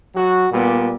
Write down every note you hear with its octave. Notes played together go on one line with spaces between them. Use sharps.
F#3 F#4
A#2 G3 B3